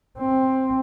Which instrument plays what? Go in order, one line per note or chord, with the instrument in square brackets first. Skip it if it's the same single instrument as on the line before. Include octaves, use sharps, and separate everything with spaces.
[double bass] C4